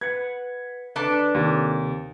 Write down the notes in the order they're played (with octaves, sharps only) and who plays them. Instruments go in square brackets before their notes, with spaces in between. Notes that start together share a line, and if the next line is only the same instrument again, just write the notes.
[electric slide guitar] B4 F#5 [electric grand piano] G#6
[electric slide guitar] D3 B4 [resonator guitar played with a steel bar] D4 A4 D5
[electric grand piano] D#2 [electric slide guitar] C3